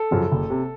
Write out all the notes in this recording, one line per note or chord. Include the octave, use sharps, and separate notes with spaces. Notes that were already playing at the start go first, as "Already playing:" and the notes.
Already playing: A4
F#2 C#3 F3
F#1
C3